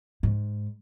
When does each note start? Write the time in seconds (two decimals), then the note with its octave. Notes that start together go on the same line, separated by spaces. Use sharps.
0.23 G#2